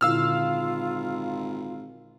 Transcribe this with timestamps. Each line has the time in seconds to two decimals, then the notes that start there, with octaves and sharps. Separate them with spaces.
0.01 G#1 A#2 D3 E4 F4 F5 E6 F6